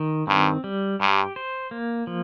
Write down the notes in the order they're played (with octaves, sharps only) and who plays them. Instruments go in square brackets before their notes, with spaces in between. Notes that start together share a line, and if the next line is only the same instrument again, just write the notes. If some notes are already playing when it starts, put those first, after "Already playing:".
Already playing: [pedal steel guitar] D#3
[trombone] G2 [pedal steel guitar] C4
[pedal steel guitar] G3
[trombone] G2 [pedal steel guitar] G4
[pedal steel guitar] C5
A#3
F3